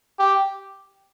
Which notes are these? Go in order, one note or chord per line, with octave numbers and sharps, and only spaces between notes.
G4